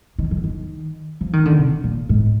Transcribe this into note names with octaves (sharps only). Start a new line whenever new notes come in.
D#3
F3
D#3
F3
D#3
D3
C3
A#2
G#2